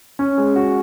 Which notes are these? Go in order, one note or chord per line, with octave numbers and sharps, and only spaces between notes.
C#4
G#3
F#4